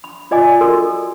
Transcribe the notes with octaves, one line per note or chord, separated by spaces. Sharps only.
B5
F4 D5 D#5 G#5 D6
F#4 A4 A#4